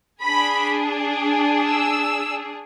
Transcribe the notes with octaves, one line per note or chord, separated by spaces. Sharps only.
D4 G#4 B5
E6